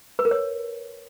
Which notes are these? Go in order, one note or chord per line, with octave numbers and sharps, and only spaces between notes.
B4
A#4
C#5